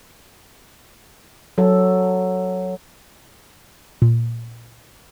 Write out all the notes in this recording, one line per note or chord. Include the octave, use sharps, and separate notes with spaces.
F#3 A4
A#2